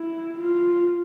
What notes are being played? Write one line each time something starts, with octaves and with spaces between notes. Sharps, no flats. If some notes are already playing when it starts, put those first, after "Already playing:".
Already playing: E4
F4